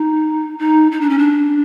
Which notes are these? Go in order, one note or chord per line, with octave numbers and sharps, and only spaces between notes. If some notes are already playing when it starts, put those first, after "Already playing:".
Already playing: D#4
D#4
D#4
D4
C#4
D4